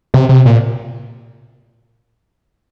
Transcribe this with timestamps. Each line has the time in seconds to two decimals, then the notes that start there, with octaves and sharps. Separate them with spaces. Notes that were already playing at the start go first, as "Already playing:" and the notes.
0.14 C3
0.29 C3
0.46 A#2